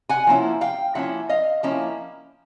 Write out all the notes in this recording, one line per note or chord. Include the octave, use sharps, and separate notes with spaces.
F#5 G#5
F3 A#3 C#4 E4
F5 G5
F3 A#3 C#4 E4 E5 F#5
D#5 F5
F3 A#3 C#4 E4